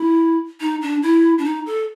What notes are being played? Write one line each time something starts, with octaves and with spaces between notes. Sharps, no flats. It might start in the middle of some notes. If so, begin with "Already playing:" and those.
Already playing: E4
D#4
D4
E4
D4
D#4
A4